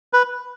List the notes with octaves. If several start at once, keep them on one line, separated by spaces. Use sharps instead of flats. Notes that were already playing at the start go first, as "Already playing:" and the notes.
B4